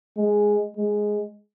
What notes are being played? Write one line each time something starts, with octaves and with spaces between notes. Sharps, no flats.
G#3
G#3